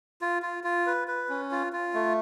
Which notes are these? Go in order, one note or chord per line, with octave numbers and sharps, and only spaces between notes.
F4
F4
F4
B4
B4
C#4
F4
F4
A3